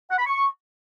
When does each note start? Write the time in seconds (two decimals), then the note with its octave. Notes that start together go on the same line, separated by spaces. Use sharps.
0.11 F#5
0.19 B5
0.26 C#6